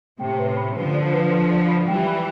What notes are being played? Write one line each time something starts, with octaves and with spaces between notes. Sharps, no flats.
A2 C3 G5
B4
B5
D3 F3 B4
D5
B4
B4
D5
B5
E3 G3 G5
B5